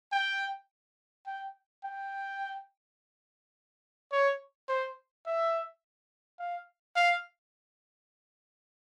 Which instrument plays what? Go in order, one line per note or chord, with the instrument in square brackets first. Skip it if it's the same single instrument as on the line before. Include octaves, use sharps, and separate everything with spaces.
[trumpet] G5
G5
G5
C#5
C5
E5
F5
F5